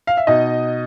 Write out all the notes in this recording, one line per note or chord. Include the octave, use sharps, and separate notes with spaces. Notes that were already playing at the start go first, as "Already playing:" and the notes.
F5
E5
B2 D#4 D#5